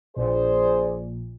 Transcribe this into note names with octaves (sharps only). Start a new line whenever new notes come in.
A#1 A#2 G#4 C5 D5